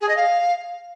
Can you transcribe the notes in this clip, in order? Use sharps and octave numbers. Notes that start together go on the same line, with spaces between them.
G#4
D#5
F5